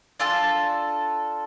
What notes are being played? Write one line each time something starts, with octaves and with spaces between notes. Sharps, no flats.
D4 F4 A4 A5